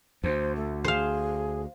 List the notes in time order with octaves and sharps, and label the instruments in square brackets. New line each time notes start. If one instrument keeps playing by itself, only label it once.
[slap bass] D2 [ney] C5
[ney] A3
[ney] G#4 [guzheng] C5 F5